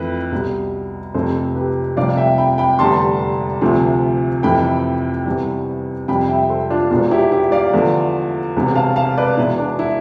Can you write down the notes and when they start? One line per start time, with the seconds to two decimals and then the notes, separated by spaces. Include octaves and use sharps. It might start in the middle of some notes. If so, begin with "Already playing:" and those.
Already playing: F2 E3 A3 B4
0.32 C2 B2 G3
1.14 F1 F2 C3 A4 C5
1.55 G4 B4
1.97 F1 F2 C3 G3 D5 F5
2.17 E5 G5
2.38 G5 B5
2.58 G5 B5
2.79 F1 E2 D3 G3 A5 C6
3.61 D2 C3 F3 A3
4.43 F2 C3 E3 A3 G5 B5
5.26 E2 C3 E3 G3
6.08 F2 C3 G3 G5 B5
6.28 E5 G5
6.49 A4 C5
6.70 D4 F4
6.90 E1 E2 B2 D4 F4
7.11 E4 G4
7.32 E4 G4
7.52 D5 F5
7.73 E2 D3 F3 A3
8.56 E1 E2 C3
8.75 F5 A5
8.96 F5 A5
9.17 B4 D5
9.37 E1 E2 B2 E4
9.58 D4
9.79 E4